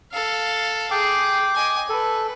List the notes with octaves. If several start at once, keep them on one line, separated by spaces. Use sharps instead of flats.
A4 F5
G#4 G5 D6
D#5 G#5
A4 B4